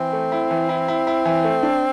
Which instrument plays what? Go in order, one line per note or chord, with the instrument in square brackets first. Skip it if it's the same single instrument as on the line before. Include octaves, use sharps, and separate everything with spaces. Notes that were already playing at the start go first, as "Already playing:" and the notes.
Already playing: [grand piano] E3 [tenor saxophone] C4
[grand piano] A3
E4
E3
E4
E4
E4
E3
A3
D4